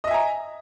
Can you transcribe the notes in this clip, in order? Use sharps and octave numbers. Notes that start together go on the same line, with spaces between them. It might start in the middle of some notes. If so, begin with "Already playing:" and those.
D#5 E5 G#5 A#5